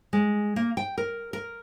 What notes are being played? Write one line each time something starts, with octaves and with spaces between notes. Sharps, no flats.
G#3
A#3
G5
A#4
A#4